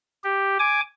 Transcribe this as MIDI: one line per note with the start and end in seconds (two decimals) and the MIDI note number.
0.24 0.57 67
0.59 0.81 80
0.59 0.81 86